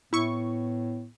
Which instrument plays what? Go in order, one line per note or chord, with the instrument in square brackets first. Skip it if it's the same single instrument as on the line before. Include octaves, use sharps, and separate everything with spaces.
[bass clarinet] A2 [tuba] B3 [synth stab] E4 C#6